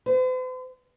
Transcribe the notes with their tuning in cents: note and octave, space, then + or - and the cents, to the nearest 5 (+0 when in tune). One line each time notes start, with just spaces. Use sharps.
C5 -45